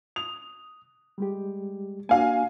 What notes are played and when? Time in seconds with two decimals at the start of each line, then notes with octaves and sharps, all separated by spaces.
0.16 D#6 F7
1.18 G3 G#3 G4
2.09 A#3 D4 F#4 F5 G#5